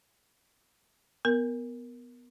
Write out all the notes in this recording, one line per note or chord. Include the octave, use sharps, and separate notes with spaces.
B3 A#4